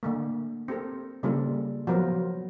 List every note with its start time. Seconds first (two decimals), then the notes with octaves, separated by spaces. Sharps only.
0.03 D3 A3 A#3
0.68 C4 G4 A4 A#4
1.23 C#3 G3 A#3 D4 F4 A4
1.87 F3 F#3 B3 A#4